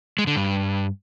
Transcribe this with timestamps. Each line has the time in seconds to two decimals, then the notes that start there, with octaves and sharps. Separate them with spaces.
0.18 G#3
0.27 D3
0.36 G2